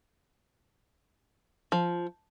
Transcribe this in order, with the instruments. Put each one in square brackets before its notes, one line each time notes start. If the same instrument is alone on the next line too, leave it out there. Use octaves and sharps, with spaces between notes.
[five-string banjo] F3